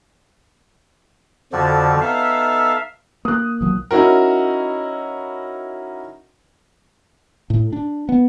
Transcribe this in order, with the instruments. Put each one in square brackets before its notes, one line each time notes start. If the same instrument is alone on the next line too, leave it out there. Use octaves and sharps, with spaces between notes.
[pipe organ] F2 D3 F3 [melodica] F#4 D5
[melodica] B3 D#4 A4 [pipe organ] E5 F5
[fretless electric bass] A#3 [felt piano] D#6 F#6
[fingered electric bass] B1 F3 F#3
[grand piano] C#4 D#4 E4 F#4 A#4
[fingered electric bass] A2
D4
B3